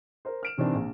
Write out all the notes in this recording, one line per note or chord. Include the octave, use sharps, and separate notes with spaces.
A#4 C5
F6 D7 E7
C3 D#3 E3 C4 D4
A#1